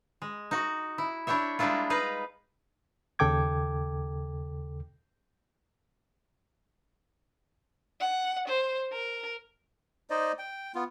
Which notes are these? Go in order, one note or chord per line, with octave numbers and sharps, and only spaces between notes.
G#3
D#4 F#4
E4
D4 E4 G4 C#5 E5
G3 G#3 A#3 D4 E4 F4
D#4 B4 F5 A#5
D#2 C#3 A4 G5 D6 G#6
F#5
C5
A#4
D#4 C5 D5 D#5
G5
B3 F4